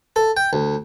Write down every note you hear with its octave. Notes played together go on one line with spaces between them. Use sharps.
A4
G5
D2